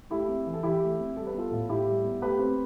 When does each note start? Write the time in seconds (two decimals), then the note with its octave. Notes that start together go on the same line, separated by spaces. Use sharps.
0.10 A3 E4 G4
0.28 C4
0.46 E3
0.53 A4
0.63 E3 E4 G4
0.82 A3
0.99 C4
1.16 G3 A4
1.27 B4
1.34 B3 F4 A4
1.51 A2
1.69 A2 E4 G4
1.87 G3
2.04 B3
2.22 A3 G4 B4
2.39 C4